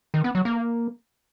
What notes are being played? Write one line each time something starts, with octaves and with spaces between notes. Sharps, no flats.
D#3
B3
F#3
A#3